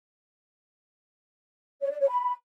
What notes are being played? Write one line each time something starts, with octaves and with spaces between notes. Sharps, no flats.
C#5
D5
C#5
B5